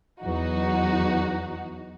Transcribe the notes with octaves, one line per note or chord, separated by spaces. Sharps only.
E2 F#3 D#4 F#4